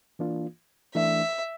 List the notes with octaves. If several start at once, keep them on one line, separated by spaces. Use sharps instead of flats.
E3 A#3 D4 F4
E3 A3 D4 E5